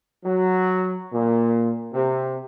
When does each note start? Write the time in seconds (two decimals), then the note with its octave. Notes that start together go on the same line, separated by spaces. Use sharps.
0.24 F#3
1.13 A#2
1.93 C3